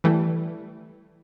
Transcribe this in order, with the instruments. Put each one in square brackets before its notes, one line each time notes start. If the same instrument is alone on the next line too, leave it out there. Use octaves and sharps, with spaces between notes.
[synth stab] E3 G3 A3